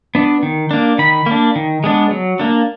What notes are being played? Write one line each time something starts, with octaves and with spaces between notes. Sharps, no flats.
B3 D4
D#3
A#3 D4
D#3 B5
A#3 D4
D#3
G#3 B3 D4
F#3
A#3 D4